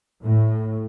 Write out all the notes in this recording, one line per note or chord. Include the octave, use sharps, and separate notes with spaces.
A2